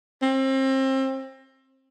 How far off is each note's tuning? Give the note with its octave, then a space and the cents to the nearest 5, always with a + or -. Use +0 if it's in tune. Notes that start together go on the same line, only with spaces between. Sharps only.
C4 +30